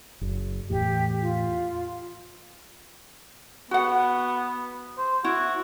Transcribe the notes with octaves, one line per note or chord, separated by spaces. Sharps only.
F#1
E2 A2 G4
F4
B3 F#4 F#5
C5
E4 F#4